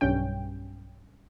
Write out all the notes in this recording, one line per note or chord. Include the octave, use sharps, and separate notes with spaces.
B1 G2 C#4 G5